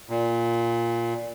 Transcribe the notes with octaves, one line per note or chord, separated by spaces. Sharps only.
A#2